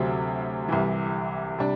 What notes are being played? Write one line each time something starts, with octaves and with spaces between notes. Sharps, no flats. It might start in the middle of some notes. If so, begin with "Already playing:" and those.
Already playing: D2 C3 F#3 C4
C2 C3 E3
C3 G3 D4